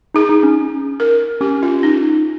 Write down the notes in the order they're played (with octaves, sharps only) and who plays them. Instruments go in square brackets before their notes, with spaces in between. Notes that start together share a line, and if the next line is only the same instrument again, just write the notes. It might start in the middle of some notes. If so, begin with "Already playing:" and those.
[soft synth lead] D#4 [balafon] G#4
[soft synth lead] D#4
C#4
[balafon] A#4
[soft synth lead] C#4 [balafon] G4
[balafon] F4
D#4